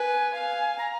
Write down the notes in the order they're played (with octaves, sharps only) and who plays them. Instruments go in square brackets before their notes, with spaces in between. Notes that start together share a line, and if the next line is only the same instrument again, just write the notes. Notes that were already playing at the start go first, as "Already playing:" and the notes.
Already playing: [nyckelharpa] B4 [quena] G#5
[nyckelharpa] F5
[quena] A#5